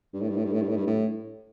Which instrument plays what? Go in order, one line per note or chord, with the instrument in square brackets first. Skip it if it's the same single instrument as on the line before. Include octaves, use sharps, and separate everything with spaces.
[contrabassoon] G2
A2
G2
A2
G2
A2
G2
A2
G2
A2